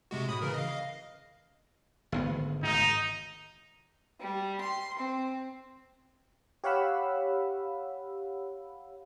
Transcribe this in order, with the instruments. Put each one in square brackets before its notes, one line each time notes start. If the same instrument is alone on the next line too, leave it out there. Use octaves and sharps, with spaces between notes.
[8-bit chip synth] C3 G#3 F#4
A2 B5 D#6
C#3 E3 A#4
D#5 F5
[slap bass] G#1 D2 B3
[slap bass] G#1 G#2 [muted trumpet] D#4
[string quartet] G3
C6
C4
[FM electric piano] G4 C#5 F5 F#5 B5 E6